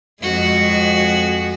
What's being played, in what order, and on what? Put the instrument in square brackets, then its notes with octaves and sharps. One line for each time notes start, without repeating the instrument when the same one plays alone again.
[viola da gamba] F2 G#3 F#4